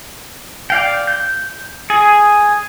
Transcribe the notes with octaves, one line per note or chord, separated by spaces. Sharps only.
D5 F5 G5
G6
G#4